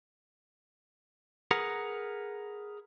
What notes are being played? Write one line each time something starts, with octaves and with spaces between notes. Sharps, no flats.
G#4 A#4 B4 F#5 A#5